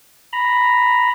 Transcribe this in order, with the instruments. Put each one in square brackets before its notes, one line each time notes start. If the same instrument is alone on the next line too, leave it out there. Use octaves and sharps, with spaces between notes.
[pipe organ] A#5 B5